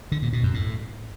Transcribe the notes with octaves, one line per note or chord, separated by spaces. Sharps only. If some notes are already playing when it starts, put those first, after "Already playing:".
D3
A#2
B2
F#2
A2